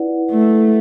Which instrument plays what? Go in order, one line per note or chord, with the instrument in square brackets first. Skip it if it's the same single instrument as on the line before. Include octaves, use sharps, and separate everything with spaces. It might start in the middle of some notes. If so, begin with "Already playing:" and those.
Already playing: [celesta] E4 B4 D5 F#5
[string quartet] A3